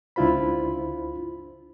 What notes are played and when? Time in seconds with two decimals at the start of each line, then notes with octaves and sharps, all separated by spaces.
0.16 C#2 D4 E4 F4 C5 B5